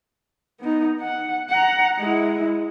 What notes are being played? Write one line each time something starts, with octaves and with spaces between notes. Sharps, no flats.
B3 D#4
F#5
F#5 A#5
G#3 E4